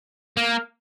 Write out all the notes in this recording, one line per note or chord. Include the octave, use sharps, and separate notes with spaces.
A#3